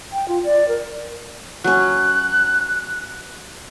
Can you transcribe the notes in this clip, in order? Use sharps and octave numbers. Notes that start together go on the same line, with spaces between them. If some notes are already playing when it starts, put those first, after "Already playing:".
G5
F4
D5
A#4
F#3 C#4 F#6